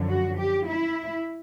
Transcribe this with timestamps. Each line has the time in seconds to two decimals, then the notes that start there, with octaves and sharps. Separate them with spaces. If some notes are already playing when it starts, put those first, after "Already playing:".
Already playing: F#2 D3 F3
0.08 F#4
0.38 G4
0.67 E4